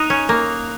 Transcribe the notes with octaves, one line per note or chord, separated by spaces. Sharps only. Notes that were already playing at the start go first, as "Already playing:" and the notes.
Already playing: D#4 D#6 F#6 F7
C#4
A#3